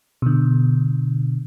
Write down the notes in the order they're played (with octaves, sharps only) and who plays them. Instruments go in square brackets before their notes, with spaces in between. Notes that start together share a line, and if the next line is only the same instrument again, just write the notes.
[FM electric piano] B2 D3